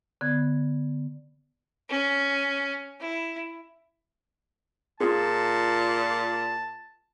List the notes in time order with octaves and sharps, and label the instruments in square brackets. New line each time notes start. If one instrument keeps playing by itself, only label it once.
[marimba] D3 B3 G#6
[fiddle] C#4
E4
[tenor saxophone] A#2 [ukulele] F4 G#4 [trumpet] A5